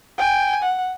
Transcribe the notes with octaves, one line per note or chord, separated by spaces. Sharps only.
G5 G#5
F#5